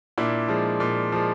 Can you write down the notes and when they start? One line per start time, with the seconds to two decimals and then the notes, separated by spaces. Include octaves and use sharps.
0.18 A#2 D4 E4
0.48 F3 G#3
0.80 A#2
1.12 F3 G#3